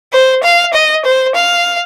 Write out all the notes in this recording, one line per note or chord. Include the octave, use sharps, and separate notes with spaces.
C5
F5
D#5
C5
F5